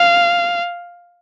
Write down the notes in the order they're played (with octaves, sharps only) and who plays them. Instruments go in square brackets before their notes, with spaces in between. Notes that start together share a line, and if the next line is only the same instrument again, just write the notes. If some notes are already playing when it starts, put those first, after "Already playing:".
Already playing: [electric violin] F5